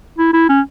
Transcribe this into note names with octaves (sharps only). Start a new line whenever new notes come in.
E4
E4
C#4